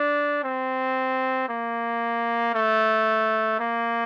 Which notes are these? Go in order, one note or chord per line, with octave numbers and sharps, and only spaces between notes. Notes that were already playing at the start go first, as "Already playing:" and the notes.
Already playing: D4
C4
A#3
A3
A#3